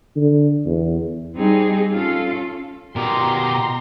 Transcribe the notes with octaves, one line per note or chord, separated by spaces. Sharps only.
D3
E2
G3 C4 D#4 G#4
C#4 F4 A4
B2 G4 A#4 A#5 C6